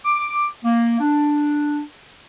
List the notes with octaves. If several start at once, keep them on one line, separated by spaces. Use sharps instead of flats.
D6
A#3
D4